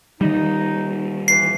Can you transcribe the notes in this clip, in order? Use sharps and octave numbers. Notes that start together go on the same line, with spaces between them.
D#3 G3 D#4
E3 C7